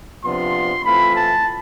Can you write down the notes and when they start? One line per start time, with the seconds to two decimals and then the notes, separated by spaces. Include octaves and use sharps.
0.24 C3 F3 B3 D4 F4 C6
0.85 E3 A3 C4 F4 B5
1.16 A5